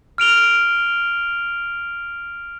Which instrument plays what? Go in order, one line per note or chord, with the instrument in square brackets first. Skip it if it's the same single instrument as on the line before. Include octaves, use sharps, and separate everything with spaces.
[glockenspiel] F6 D7 F7 G7